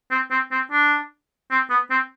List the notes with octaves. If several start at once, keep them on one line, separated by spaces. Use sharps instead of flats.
C4
C4
C4
D4
C4
B3
C4